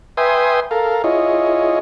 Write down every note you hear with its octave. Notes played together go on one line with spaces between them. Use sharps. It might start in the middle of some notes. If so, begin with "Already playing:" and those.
B4 E5 G5 G#5 C6 D#6
A4 A#4 F5
E4 F4 G#4 C#5 D#5